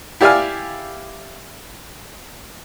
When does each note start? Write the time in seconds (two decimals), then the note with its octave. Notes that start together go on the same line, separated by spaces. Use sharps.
0.21 E4 G4 D5 F5 G#5 F6